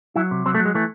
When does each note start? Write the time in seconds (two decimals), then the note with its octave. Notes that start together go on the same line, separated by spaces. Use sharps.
0.16 F#3 E4
0.31 C3
0.46 F#3 C4
0.55 A3
0.60 F#3
0.65 G#3
0.75 E3 A3